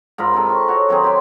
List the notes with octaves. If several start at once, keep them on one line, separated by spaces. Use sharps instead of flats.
G#2 F4 A#4 B5
C3 D#4 A4
B5 C#6
F#4 C#5
D#3 F#3 C4 G#4
G4 C6